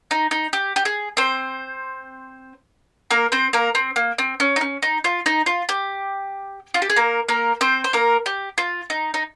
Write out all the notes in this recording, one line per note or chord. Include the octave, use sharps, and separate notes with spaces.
D#4
D#4
G4
G4
G#4
C4 C5
A#3 A#4
C4 C5
A#3 A#4
C4
A#3
C4
C#4
D#4
C#4
D#4
F4
D#4
F4
G4
F4
G4
G#4
A#3 A#4
A#3 A#4
C4 C5
C5
A#3 A#4
G4
F4
D#4
D#4